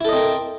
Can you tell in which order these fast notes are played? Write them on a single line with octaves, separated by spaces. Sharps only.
E4 A4 D#5 C4 A#4